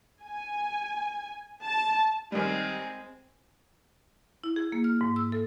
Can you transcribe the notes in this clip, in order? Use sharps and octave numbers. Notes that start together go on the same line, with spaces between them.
G#5
A5
D#3 G3 G#3 C4
E4
G#4
A#3
F6
G#2
E6
A4